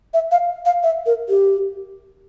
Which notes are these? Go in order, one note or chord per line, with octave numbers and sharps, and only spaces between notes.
E5
F5
F5
E5
A#4
G4